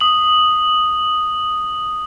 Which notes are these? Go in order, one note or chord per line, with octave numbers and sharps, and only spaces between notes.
D#6 F#7